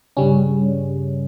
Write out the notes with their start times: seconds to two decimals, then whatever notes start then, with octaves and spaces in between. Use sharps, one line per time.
0.17 G2 C#3 G3 C#4